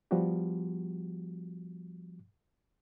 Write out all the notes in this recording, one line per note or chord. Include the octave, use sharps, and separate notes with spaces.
F3 G3 B3 F#4 G4